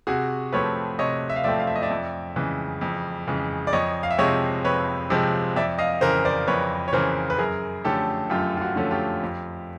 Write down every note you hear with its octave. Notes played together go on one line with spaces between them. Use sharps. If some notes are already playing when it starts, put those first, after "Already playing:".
C3 F#4 G#4
F3 A3 C4 B4 C#5
C3 C#5 D#5
E5
F5
F3 A3 C4 D5 E5
F5
E5
D#5
D5 E5
F2
C#3 E3 G#3
F2
C#3 E3 G#3
D5
F2 C#5 D#5
F5
E5
C3 F3 G#3 C4 C#5 D#5
F2 B4 C#5
C3 F3 G#3 C4
F2 D5 E5
D#5 F5
C#3 E3 A#4 C5
C5 D5
F2 B4 C#5
C#5
C#3 E3 A#4 C5
B4
F#2 G#4 A#4
D3 F3 A3 C#4 G4 A4
F#2 F4 G4
F4
F#4
D3 F3 A3 C#4
F4 G4
F2